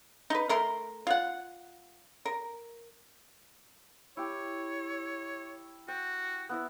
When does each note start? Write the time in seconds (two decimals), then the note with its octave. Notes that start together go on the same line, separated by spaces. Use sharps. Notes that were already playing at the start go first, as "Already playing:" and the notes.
0.30 D#4 B4
0.49 A3 A#4 C6
1.07 F4 F#5
2.25 A#4
4.17 E4 G4 C#5
5.88 F#4 G5
6.49 B3 E4 E5